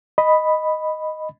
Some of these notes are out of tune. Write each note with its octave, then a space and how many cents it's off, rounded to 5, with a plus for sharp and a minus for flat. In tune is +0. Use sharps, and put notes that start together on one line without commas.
D#5 +0 B5 +0